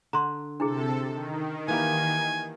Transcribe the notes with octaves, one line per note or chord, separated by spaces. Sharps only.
D3 A#5 C6
C3 D4 E4 G#4 A4
D#3
E3 A#3 G4 G#5